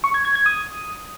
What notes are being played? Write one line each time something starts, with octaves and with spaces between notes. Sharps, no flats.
C#6
G#6
G#6
G#6
D#6